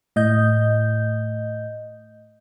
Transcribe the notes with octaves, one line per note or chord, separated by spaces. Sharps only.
A2 D#5 G6